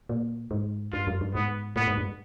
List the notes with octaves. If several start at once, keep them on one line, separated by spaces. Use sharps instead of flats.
A#2
G#2
G2 F4
F#2
G2
G#2 B3
A2 B3
G#2
G2